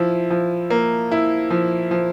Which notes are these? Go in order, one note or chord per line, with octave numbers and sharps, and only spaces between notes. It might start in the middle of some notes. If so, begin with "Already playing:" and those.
Already playing: F3 E4
F3
A#3
E4
F3
F3